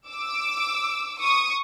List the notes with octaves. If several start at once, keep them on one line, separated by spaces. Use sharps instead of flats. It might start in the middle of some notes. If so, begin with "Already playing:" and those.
D6 E6
C#6 D#6